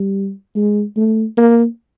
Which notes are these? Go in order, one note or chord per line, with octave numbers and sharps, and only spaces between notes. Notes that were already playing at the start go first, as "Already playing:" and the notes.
Already playing: G3
G#3
A3
A#3